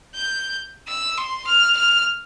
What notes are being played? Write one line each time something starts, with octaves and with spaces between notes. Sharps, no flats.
G6
E6
C6
F6
F6